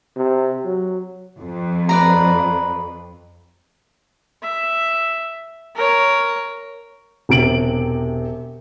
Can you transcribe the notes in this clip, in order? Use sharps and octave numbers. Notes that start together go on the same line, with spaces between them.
C3
F#3
F2
B4 D5 A#5
E5
A#4 C#5
E1 C3 D7 F#7